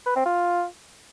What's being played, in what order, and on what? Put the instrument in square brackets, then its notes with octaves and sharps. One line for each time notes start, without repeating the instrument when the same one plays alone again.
[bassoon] B4
C4
F4